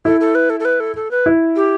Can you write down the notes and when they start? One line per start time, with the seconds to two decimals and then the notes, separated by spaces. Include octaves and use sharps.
0.05 E4 A4
0.20 A4
0.35 B4
0.50 A4
0.60 A4
0.65 B4
0.80 A4
0.96 A4
1.11 B4
1.26 E4
1.56 G4